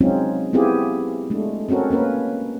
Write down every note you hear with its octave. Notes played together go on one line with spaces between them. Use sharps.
F#3 G#3 C4 C#4 D#4 F4
B3 C4 E4 F4 G4 G#4
G#3 A3 D4
C4 C#4 F#4 A4 A#4
A#3 C#4 A#4 B4